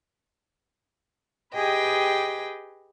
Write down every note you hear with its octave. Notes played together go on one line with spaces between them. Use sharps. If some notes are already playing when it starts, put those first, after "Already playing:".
G4 G#4 B4 D#5 G5